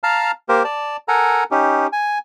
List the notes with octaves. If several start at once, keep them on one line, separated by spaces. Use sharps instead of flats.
F5 A5 A#5 F6
A#3 G4 A#4 C5
D5 A5
A4 A#4 F#5 G#5 A#5
C#4 D#4 G4
G#5